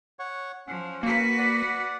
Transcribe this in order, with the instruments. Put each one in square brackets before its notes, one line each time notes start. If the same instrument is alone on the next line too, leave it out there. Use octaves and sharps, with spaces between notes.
[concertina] C#5 F#5 C#6
[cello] F3 [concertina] C#4 F#5
[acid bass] A#3 [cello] F#4 B4
[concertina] D5 F#5